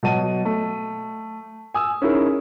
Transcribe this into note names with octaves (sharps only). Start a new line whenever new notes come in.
B2 F#3 D#5 A5 D#7
A3
G#5 D#6 E6
C#4 D#4 E4 G#4 A#4